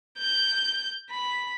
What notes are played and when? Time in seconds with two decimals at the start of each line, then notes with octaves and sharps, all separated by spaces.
0.18 G6
1.11 B5